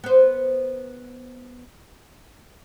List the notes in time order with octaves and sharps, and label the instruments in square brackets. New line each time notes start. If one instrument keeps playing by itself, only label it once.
[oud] B3 C5